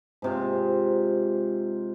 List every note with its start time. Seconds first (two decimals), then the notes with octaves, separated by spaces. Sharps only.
0.22 G#2 C3 F4